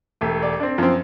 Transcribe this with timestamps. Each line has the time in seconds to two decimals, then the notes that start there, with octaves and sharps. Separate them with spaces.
0.21 E1 A3 G4
0.43 D5
0.60 C4 D4
0.78 F#2 F3 C4